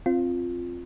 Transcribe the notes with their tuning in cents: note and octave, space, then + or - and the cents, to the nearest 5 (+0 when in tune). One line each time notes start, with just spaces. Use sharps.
C4 +10 F4 +0